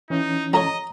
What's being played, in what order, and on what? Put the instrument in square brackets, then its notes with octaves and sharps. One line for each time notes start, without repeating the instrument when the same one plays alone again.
[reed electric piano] E3 C#4 [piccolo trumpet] D#4
[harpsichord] F3 A4 C#5 [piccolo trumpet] D#5 [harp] A#5